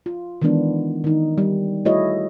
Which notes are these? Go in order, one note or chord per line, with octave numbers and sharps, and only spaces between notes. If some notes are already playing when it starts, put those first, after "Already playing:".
F4
D#3 E3 G#3 B3 D4
D#3 D#4
G3
A3 E4 F#4 G#4 C#5 D#5